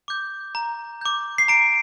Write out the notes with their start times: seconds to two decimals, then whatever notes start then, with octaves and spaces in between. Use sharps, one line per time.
0.08 D6 G6
0.55 A#5
1.01 D6 G6
1.38 C7
1.48 A#5 D7